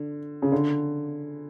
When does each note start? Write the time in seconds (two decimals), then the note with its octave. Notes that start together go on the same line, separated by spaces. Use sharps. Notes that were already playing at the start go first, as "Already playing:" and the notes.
Already playing: D3
0.42 C#3
0.52 D3